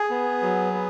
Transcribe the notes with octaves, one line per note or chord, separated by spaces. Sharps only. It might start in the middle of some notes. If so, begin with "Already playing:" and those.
Already playing: G#4
B3
F#3
B3